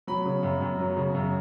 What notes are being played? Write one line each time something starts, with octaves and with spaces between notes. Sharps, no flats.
F#3 B5
C#3
F#2
F#2
F#3
C#3
F#2